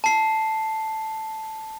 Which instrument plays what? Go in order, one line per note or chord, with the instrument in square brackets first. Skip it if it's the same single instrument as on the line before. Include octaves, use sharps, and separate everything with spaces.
[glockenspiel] A5 C7